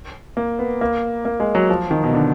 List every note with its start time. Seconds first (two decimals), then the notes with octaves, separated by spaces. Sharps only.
0.37 A#3
0.59 B3
0.81 A#3
1.25 A#3
1.40 G#3
1.55 F#3
1.70 F3
1.91 D#3
2.03 B2
2.13 D3